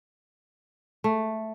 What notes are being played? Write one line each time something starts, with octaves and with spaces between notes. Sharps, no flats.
A3